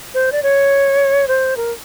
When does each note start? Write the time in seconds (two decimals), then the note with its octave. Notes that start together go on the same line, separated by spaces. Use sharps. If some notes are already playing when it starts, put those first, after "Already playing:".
0.14 C5
0.32 D5
0.43 C#5
1.28 C5
1.57 A#4